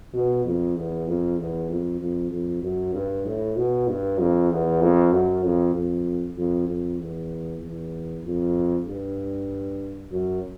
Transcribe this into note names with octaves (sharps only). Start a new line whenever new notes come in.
B2
F2
E2
F2
E2
F2
F2
F2
F#2
G2
A2
B2
G2
F2
E2
F2
F#2
F2
F2
F2
F2
E2
E2
F2
G2
F#2